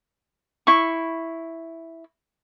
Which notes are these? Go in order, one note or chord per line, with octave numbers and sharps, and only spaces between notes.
E4 C#6